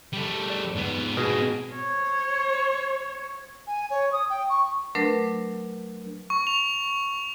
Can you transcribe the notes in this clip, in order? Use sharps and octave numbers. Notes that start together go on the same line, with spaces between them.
G3 A3
D5
G#2 B3
B2 G#4
C5 C#5
G#5
C#5
D#6
G5
C#6
F#3 A3 D4 A#4 B4
C#6
F7